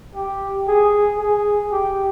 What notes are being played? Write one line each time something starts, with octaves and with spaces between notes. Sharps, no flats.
G4
G#4
G#4
G4